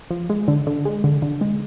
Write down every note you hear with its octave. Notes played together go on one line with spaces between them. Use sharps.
F3
G#3
D3
D3
G#3
D3
D3
G#3